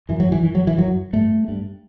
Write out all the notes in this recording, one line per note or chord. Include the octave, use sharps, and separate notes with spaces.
F#2 E3
F#3
E3
F#2 E3
F#3
E3
F#2 F#3
G2 A3
G2